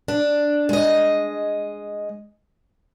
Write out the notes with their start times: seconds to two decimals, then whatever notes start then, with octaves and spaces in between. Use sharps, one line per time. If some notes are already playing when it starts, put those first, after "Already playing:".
0.08 D4
0.69 G#3 D#5